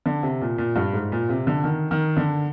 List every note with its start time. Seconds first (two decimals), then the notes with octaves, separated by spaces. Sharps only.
0.06 D3
0.23 C3
0.41 A#2
0.58 A#2
0.76 G2
0.93 G#2
1.12 A#2
1.29 C3
1.47 D3
1.64 D#3
1.91 D#3
2.17 D3